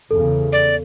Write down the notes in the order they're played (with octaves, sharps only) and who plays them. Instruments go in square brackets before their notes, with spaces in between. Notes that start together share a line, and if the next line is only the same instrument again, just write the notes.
[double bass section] E2 C#3 [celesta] A4
[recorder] D5